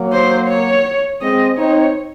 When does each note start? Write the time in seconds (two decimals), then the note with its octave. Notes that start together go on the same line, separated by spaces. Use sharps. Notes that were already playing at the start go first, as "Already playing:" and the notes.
Already playing: F#3 A#3
0.13 C5
0.49 C#5
1.22 G#3 C4 D#5
1.58 C4 D#4 C#5